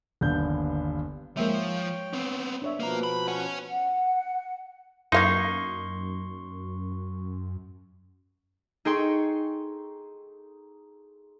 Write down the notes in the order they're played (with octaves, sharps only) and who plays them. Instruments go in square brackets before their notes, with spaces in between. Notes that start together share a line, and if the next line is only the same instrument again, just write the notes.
[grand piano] G1 D#2 B3 D4 G6
[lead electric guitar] F3 [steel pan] G#3 A#3 E5 [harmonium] C#5 G5
[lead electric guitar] B3 C4
[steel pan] D4 C#5 E5
[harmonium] B2 F3 B4 [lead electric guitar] A#3 A#5
[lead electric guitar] B5
[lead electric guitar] C#5 G#5 [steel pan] F#5
[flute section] F#5
[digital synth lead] F#2 [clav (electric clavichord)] A#3 D#4 [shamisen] E4 F5 F#5 [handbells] C6 C#6
[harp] D#4 G#4 A4 G5 C6 C#6